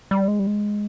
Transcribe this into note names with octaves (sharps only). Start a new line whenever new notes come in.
G3
G#3
G3
G#3